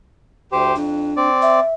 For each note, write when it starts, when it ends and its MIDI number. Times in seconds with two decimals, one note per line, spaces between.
0.52 0.75 38
0.52 0.75 67
0.52 0.75 72
0.76 1.13 41
0.76 1.29 62
1.17 1.60 60
1.17 1.60 74
1.42 1.74 76